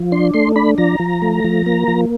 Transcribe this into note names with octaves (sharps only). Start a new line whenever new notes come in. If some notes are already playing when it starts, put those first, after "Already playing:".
Already playing: F3
D4 C6
A3 C6
D4 B5
F3 A#5
F3
A3
F3
A#3
F3